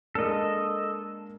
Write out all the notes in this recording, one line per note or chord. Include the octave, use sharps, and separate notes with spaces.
G#3 A#3 D4 A4 D#5